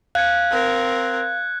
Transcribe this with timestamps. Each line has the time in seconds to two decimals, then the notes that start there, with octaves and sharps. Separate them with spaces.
0.15 F5 F#6 G#6 C#7
0.51 C4 A#4